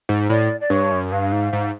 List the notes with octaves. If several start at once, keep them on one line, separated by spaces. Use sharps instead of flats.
G#2
A2 D5
D5
G2 C#5
F#2
G2 F5
G#2
G#2